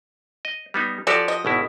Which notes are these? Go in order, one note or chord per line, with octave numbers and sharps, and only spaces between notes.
D#5
G3 B3 D#4
F3 F#4 G4 A4 D5
D#5
G#1 B2 E4